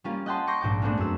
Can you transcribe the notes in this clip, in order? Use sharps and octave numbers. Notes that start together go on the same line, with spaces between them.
G3 A#3 C#4 F4
D#5 F#5 G5 A5 C6
C#6 D6 G6 A#6 C7 C#7
A#1 G#2 G5 D6
G#3 A3 B3 C4 D4
F#2 E6